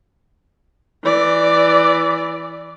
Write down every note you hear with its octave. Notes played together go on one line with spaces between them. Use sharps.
E3 D5